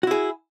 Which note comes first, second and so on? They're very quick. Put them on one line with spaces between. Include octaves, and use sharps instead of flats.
F#4 E4 G#4